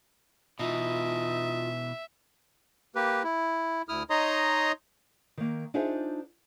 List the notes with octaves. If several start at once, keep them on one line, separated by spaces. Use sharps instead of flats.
B2 E3 D#4 F4 E5
A#3 G4 B4
E4
D2 E4 D#6 F6
D#4 C#5 D#5 A#5 C6 D#6
D#3 A#3
D4 D#4 F4 G#4 C5 E5